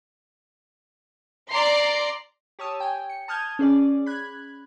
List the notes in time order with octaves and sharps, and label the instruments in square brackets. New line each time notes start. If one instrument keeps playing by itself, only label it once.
[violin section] D5 A#5 C6 C7
[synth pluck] G4 C#5 A5 D#6 E6
G5 G#5
C#7
A5 D#6 F6 G6 G#6
C#4 G#4 D5
B5 F#6 G#6